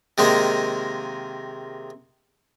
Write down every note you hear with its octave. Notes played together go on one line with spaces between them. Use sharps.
C3 D#3 G#3 A#3